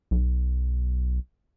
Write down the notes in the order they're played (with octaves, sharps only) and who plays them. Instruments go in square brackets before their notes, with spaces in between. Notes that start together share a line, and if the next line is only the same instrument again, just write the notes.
[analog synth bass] B1